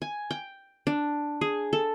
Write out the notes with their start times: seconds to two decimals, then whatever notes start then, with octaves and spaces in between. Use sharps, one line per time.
0.02 G#5
0.31 G5
0.87 D4
1.41 G#4
1.73 A4